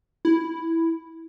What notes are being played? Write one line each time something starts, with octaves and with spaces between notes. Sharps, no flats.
E4